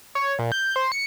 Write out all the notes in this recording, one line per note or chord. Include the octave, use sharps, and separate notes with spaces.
C#5
A#2
G6
C5
C#7